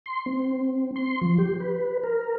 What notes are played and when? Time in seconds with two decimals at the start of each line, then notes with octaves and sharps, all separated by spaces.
0.06 C6
0.26 C4
0.96 C6
1.21 F3
1.38 G4
1.60 B4
2.04 A#4